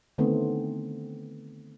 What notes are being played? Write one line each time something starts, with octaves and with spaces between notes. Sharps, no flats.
D3 D#3 A3 B3 C4